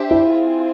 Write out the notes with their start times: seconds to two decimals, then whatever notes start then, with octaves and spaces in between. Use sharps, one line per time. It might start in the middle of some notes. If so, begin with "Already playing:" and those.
Already playing: D4 G4 C5 E5
0.11 E4
0.33 C4 F4 G#4